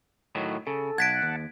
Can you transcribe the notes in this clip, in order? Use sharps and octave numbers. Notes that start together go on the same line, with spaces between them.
A2 D#3 F#3
C#3 A4
B1 F#5 A5 G#6 B6 D7
D#2